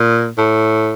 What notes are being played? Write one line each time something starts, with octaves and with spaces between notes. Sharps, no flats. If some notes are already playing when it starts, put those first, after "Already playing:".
Already playing: A#2
A2